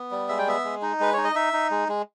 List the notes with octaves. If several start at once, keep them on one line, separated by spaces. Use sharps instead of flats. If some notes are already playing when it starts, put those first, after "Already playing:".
Already playing: B3
G3
G#3 E5
G5
B3 E5
G#3
D#4
G#3 B4
D#4 C#5
D#5
D#4 E5
D#4
G#3
G#3